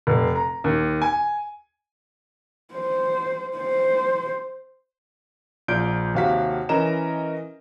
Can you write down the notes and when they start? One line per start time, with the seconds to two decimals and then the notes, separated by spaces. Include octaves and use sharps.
0.07 F1
0.36 A#5
0.64 D#2
1.02 G#5
2.73 C5
3.58 C5
5.68 A#1 F4 D5 G6 D7
6.14 D#2 C3 F#4 F5 F#5 B6
6.69 E3 C#4 A#4 D#5 A#5 E7